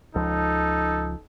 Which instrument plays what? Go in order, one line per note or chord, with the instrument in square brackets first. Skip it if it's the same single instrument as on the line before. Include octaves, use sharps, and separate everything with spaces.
[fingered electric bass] C#2 F3 [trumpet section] D#4 A4